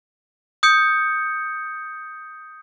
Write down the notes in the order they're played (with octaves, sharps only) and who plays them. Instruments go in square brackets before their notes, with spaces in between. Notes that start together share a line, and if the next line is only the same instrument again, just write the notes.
[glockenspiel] D#6 G6 C#7